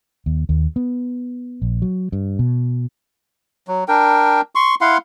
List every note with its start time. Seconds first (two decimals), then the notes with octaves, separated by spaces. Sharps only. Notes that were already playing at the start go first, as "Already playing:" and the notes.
0.26 D#2
0.49 D#2
0.76 B3
1.62 A#1
1.82 F#3
2.12 G2
2.39 B2
3.68 F#3
3.88 D4 A#4 G5
4.55 C6 C#6
4.81 E4 F5 F#5 C6